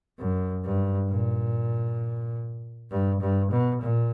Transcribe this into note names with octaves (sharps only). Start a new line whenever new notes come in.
F#2
G2
A#2
G2
G2
B2
A#2